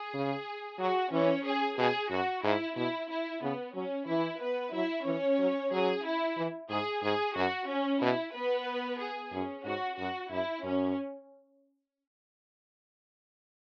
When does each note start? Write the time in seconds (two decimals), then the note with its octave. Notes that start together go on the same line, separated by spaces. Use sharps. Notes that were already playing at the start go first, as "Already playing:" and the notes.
Already playing: G#4
0.14 C#3
0.79 F#3 F#4
1.12 E3 C#4 C#5
1.45 G#4
1.78 B2 G#4
2.10 F#2 F#4
2.43 G#2 E4
2.76 B2 E4
3.10 E4
3.42 C#3 B3
3.74 F#3 C#4
4.07 E3 E4
4.41 B3 B4
4.73 F#3 E4 E5
5.06 E3 C#4 C#5
5.39 F#3
5.72 F#3 G#4
6.05 E4
6.37 E3
6.70 G#2 G#4
7.03 G#2 G#4
7.36 F#2 F#4
7.69 C#4
8.02 B2 E4
8.34 B3 B4
8.99 G#4
9.32 F#2 C#4
9.65 G#2 F#4
9.98 F#2 F#4
10.31 F#2 E4
10.63 F#2 C#4